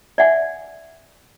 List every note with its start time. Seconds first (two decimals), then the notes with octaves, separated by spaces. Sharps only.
0.18 D5 E5 F#5 G#5